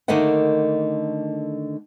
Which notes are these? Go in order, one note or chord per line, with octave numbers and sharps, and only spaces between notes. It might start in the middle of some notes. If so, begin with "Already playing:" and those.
D3 D#3 A3 A#3 D#5 F#5